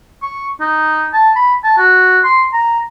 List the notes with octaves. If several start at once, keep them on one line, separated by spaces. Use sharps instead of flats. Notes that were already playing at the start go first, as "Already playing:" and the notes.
C#6
D#4
A5
B5
A5
F#4
C6
A#5